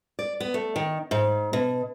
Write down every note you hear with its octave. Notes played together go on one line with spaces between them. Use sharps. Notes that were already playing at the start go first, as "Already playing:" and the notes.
D5
B3
A3
D#3
G#2
B2